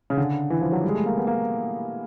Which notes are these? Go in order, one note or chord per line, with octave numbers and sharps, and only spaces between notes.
C#3
D3
E3
F3
F#3
G3
G#3
A3
A#3
B3
A#3